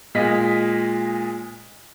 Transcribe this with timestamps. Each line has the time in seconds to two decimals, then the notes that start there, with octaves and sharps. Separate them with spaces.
0.15 A#2 G#3 D#5 B6